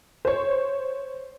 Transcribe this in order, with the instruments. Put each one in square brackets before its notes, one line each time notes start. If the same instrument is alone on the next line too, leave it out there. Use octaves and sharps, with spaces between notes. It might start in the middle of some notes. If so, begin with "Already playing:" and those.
[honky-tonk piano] C5 C#5